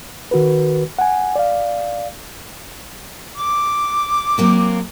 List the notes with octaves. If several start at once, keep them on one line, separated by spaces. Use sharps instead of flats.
D#3 F#4 A#4 B4
F#5 G#5
D5 F5
D6
F#3 A#3 C4